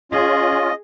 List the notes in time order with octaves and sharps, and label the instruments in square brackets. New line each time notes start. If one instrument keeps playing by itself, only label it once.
[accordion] C#4 F4 [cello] G#4 [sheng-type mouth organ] D#5